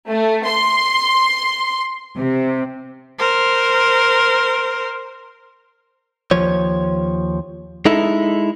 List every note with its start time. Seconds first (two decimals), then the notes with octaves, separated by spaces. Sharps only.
0.10 A3
0.47 C6
2.17 C3
3.19 A#4 C5
6.31 D#2 F3 C#5
7.85 G#3 D#4 E4 A4